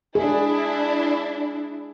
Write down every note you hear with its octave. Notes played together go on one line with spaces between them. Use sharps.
D4 E4 G#4